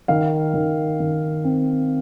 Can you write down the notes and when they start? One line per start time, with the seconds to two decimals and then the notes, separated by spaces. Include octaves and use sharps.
0.08 D#3 F5
0.54 D#3
1.00 D#3
1.44 C4